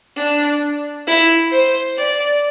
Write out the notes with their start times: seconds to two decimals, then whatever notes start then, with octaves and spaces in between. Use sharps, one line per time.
0.16 D4
1.07 E4
1.52 C5
1.97 D5